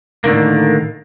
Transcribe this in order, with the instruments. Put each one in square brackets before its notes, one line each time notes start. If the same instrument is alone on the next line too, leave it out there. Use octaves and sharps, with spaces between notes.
[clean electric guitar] A2 D3 D#3 A#3